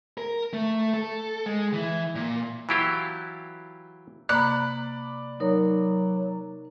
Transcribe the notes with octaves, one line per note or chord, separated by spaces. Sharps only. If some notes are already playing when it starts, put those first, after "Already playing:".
A#4
A3
A4
G#3
E3
A#2
E3 F#3 E4 F4 G4
C3 A#3 D5 A#5 B5 F#6
F#3 D#4 A#4 C#5